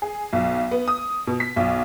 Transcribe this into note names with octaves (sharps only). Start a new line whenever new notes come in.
G#4
B1
B3
D#6
B2
B6
B1